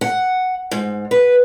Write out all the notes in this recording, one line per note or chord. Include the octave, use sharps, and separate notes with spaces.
F#5
G#2
B4